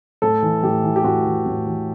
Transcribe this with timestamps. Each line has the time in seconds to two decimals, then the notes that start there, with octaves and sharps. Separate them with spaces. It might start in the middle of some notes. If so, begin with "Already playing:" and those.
0.22 A2 A4
0.42 E3
0.63 A2 G4
0.83 E3
0.96 G4
1.04 A2 F#4
1.25 E3
1.46 A2
1.66 E3